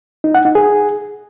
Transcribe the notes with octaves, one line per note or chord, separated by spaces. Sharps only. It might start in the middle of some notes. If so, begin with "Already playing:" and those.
D#4
F#5
D#4
G#4